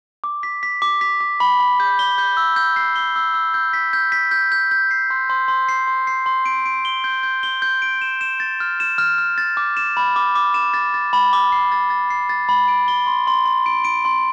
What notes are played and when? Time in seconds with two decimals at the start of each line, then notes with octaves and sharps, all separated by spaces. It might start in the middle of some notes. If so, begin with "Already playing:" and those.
0.24 D6
0.43 B6
0.63 B6
0.82 D6
1.01 B6
1.20 D6
1.40 B5
1.60 B5
1.80 G6
1.99 G7
2.18 G6
2.37 E6
2.56 G6
2.76 C7
2.96 G7
3.16 E6
3.34 E6
3.54 G6
3.73 B6
3.93 G6
4.12 B6
4.31 G6
4.52 G6
4.71 G6
4.91 C7
5.10 C6
5.30 C6
5.48 C6
5.69 C7
5.87 C6
6.07 C7
6.26 C6
6.46 D7
6.66 D7
6.85 G7
7.04 G6
7.23 G6
7.43 G7
7.62 G6
7.82 D7
8.01 E7
8.21 E7
8.40 A6
8.60 F6
8.80 E7
8.98 F6
9.18 F6
9.38 A6
9.57 D6
9.77 E7
9.97 B5
10.16 D6
10.35 D6
10.54 E7
10.74 A6
10.94 A6
11.13 B5
11.33 D6
11.52 C7
11.72 A6
11.90 A6
12.10 C7
12.29 A6
12.49 B5
12.68 D7
12.88 G7
13.07 C6
13.27 C6
13.46 C6
13.66 D7
13.85 D7
14.05 C6